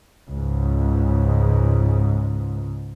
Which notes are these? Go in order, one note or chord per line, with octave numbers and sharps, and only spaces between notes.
C#2 G#2